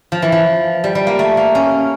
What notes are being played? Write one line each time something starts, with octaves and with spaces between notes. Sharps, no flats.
F3
E3
F3
G3
G3
A#3
A3
A#3
C#4